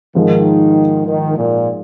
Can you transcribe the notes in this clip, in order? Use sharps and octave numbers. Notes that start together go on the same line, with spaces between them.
G#2 D#3 F3 G#3
D#3
A#2